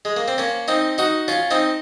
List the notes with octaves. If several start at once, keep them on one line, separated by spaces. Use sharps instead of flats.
G#3
A#3
C4
A#3 C#4
C4 D#4
D#4 F#4
C#4 F4
C4 D#4